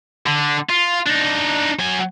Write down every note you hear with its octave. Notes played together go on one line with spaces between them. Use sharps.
D3
F4
D4 D#4
F#3 G#5